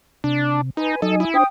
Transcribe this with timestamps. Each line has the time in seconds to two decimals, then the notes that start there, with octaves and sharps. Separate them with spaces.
0.24 C3 D4
0.77 D#4 B4 G#5
1.02 F#3 D#4 A4 D#5
1.20 E4
1.34 D4 C5 G5 D#6